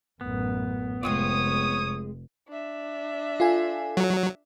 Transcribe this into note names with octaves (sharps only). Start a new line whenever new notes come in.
A1 F#2 B3
F1 G#3 C4 F4 C#5 D#6
D4 E5
F4 A4 G#5
F#3